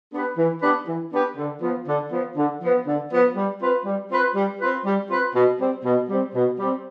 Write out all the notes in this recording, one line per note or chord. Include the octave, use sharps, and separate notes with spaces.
B3 D4 G4 B4
E3
B3 D4 G4 B4
E3
B3 D4 G4 B4
D3
F3 B3
D3
F3 B3
D3
F3 B3
D3
F3 B3
G3
C4 F4 B4
G3
C4 F4 B4
G3
C4 F4 B4
G3
C4 F4 B4
B2
G3 C4
B2
G3 C4
B2
G3 C4